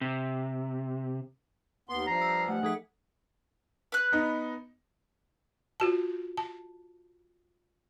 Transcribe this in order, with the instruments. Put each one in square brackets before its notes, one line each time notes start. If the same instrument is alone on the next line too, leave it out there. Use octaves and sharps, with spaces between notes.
[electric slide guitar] C3
[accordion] D#2 B3 C6
[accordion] G2 F3 [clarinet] A#5 [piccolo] C7
[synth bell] E6
[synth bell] A3 [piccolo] F#5
[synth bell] F3 A4 B6 [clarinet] G#4
[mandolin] B4 F#6
[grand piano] B3 D#4
[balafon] F4 F#4 A5
A5